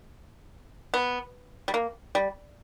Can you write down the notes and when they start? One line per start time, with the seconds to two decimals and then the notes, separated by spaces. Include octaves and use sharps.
0.94 B3
1.68 G3
1.74 A#3
2.15 G3